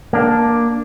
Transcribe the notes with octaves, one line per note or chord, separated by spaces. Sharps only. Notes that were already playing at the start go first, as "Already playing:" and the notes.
A#3 D4